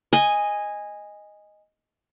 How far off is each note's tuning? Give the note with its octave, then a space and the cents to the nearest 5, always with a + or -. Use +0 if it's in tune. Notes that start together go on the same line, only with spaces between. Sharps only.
D#5 +0 G#5 -10